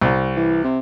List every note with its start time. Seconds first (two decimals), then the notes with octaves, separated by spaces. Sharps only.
0.02 C2
0.36 E3
0.64 C3